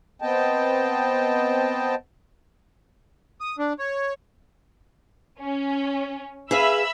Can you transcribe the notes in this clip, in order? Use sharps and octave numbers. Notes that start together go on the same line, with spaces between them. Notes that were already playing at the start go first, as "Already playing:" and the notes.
B3 C4 D#5 G5 A5
D#6
D4
C#5
C#4
G#4 B4 E5 F5 B5 E6